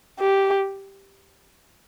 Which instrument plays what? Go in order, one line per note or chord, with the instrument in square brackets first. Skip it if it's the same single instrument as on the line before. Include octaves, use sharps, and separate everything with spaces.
[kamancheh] G4